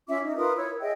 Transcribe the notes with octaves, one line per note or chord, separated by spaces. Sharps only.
C#4 F4 E5 D6
D#4
F4 A#4 B4 D#6
E4 C#5 E6
A#4
G#4 D#5 E5 G5